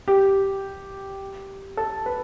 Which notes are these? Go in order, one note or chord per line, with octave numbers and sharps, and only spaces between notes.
G4
A4
B4